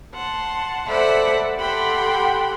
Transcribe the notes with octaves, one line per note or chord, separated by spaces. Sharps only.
F#5 A5 C6
A4 C5 D5 E5 F#5 B5
G4 A4 F#5 G5 B5 C6